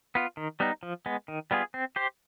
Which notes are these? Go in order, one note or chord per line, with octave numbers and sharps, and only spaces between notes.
B3 F4
D#3
G3 B3 D#4
F3
G#3 B3
D#3
G3 B3 F4 G#4
C4
G4 C5